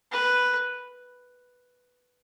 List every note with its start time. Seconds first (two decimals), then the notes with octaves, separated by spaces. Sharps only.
0.12 B4